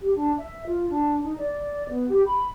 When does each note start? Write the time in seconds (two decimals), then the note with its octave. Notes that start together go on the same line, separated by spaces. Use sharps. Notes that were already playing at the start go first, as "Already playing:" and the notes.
0.01 G4
0.16 D4
0.38 E5
0.67 F4
0.90 D4
1.24 D#4
1.38 D5
1.89 B3
2.09 G4
2.26 B5